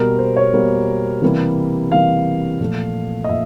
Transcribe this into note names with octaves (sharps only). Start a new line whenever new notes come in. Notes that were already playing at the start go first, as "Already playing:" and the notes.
Already playing: B2 G3 A#3 A#4
C5
C#5
B2 G3 A#3
C3 E3 G3 A#3
C3 E3 G3 A#3 F5
A#2 F3 A3
D#5
A#2 E5